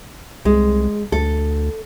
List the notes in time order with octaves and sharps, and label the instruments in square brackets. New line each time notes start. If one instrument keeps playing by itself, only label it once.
[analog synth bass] C2 [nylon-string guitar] G#3
[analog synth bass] D2 [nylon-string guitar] A4